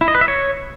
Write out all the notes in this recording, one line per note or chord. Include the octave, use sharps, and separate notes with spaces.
E4
D#5
B4
E5
C#5